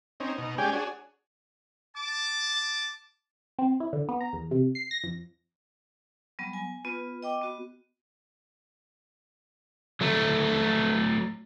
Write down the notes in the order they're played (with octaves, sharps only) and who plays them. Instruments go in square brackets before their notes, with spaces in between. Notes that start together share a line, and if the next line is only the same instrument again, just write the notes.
[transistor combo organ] C4 C#4 D#4
B2 D#4
G#3 C#4 G4 D5 G5 G#5
D4 F#4 G#4 C#5
[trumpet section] A5 D6
[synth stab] C4
E4
D3
B3
A#5
E2
C3
C7
A#6
F2
[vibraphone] F#3 G3 B3
G#5
B3 F4 B4
D#5 G5 D6
B3 F#4
[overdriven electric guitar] F#3 A3